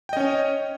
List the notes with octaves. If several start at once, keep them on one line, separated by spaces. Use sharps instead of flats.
C#4 C#5 D#5 G5